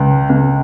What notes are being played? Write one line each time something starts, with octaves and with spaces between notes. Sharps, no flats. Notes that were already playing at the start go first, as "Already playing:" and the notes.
Already playing: C#2
C#2